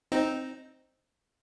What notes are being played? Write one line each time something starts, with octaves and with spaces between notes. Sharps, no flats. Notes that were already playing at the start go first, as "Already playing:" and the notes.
C4 D#4